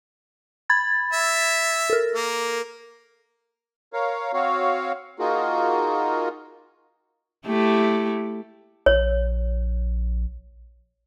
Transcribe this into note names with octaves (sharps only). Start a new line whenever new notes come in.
B5 G#6 A6
E5
A4 A#4
A#3
A#4 C#5 F5
C4 F#4 C#5 F5
A#3 D#4 F4 F#4 G#4 A#4
A3 E4 G4
A#1 C#5